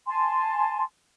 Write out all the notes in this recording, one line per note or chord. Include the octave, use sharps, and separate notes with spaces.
G#5 A5 C6